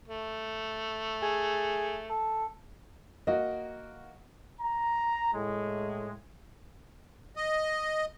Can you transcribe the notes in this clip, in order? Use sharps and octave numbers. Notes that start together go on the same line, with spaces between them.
A3
G#4
A4
A#3 F#4 D#5
A#5
A2 G#3
D#5